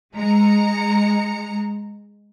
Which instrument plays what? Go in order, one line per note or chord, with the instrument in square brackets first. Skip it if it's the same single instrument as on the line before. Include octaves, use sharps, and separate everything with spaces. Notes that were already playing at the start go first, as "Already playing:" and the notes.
[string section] G#3 A#5 C#7